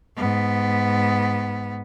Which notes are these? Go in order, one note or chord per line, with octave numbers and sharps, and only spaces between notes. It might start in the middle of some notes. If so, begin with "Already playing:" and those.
G#2 B3